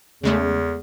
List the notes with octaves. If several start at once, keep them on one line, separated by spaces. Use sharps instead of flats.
E2 C#3 G#3 A3